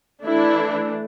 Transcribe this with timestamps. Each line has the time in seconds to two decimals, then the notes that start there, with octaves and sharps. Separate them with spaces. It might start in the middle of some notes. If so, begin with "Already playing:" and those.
0.23 E3 A3 D4 E4